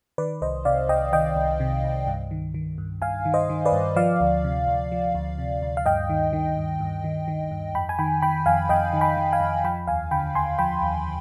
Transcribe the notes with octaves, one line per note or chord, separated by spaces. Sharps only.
D#3 B4 D5
C2 C5 D#5
C3 D5 F5
C2 D#5 G5
D#3 D#5 G5
C2
C3
C2
G2
D#3
D#3
G2
G2 F5 G#5
D#3
C5 D#5
D#3
B4 D5
G2
F3 D5 F5
D2
C3
D2
F3
D2
C3
D2
F5
G2 D#5 G5
D#3
D#3
G2
G2
D#3
D#3
G2
F2 G5 B5
G#5
D#3 G5 B5
D#3 G5 B5
F2 F5 G#5
F2 D#5 G5
D#3
G5 B5
D#3
F5 G#5
F2
F3 G5 B5
D#2 F5 G#5
D3 G5 B5
D#2 G#5 C6
F3 G5 B5
D#2